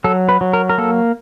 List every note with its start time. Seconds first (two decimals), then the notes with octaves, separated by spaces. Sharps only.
0.04 F#3 A4
0.29 B4
0.41 F#3
0.53 A#4
0.69 A#4
0.78 A#3 A4